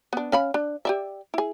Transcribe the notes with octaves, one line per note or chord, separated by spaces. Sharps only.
B3 D4
C#4 F5 B5
D4
G4 D5 E5
E4 G#4